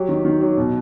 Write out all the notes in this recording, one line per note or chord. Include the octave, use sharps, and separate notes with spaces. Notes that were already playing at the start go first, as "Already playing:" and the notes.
Already playing: F#3 G4
D#3
D#3
F#3
B2